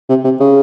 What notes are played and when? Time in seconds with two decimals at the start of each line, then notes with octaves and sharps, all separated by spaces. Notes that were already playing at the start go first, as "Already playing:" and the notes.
0.09 C3
0.24 C3
0.40 C#3